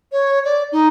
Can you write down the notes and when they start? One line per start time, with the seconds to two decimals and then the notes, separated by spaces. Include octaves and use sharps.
0.12 C#5
0.45 D5
0.72 D#4